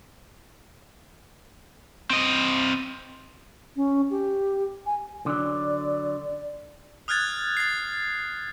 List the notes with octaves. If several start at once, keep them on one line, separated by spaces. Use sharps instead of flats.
C4 D#5
C#4
G4
G#5
D3 F#3 D5
D#6 F6 F#6 G#6 A6
A6 C7